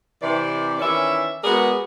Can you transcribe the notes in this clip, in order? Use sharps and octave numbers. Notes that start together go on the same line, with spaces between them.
C3 E3 D5
D#3 E3 C#4 E4 D5 E5
G#3 B3 F#4 G#4 A#4 D5